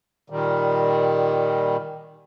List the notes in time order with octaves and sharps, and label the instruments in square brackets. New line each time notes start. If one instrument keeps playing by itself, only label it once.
[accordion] A#2 D#3 G3